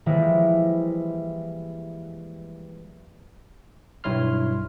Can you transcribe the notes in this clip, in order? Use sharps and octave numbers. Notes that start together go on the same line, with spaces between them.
E3 F3 G3 G#3 A#3 E4
B1 G2 E4 C#5 C6 F6